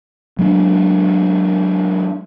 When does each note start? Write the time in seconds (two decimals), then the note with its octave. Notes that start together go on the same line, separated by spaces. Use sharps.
0.39 F#3 G#3 A#3 D4